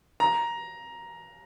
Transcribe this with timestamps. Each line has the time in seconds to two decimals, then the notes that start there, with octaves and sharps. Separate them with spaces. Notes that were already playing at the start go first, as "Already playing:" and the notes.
0.20 A#5